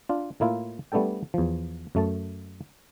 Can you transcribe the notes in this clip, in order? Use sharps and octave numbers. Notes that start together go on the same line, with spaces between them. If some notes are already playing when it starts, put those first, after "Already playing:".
D4 F4
A2 A#3 E4 F4
G3 A3 B3 D4 A4 G5
E2 F3
F#2 A3 A5